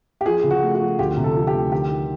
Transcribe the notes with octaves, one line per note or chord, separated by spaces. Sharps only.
G4
F3 G#4
C#3
F#4
A3
F#4
F3
D2 G4
C3
A4
F3
G4
D2
D#3 G4
D#3